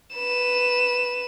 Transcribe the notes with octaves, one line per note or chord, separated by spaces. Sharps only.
B4 E7